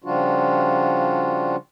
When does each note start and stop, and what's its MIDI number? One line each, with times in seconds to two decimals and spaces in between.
0.04 1.56 49
0.04 1.56 53
0.04 1.56 55
0.04 1.56 62
0.04 1.56 65
0.04 1.56 66